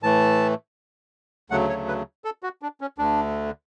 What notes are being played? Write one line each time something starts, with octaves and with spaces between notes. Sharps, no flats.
A2 E3 A3 A5
D2 C#3 F#3 A3 F#5
C#5
B4
A4
F#4
D4
C#4
D2 D3 A3 D4